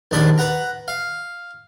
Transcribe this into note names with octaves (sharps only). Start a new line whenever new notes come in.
A#1 D#2 D4 D5 B5
B4 F#5 A#5
F5